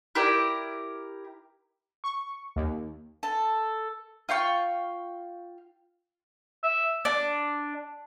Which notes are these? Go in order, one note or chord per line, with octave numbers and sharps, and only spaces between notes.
E4 G4 A#4 D5
C#6
D#2
A4
F4 F5 G5 C#6
E5
D4